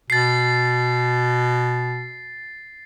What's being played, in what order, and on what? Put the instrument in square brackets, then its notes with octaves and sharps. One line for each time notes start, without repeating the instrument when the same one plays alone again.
[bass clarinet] B2 [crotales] A6 C7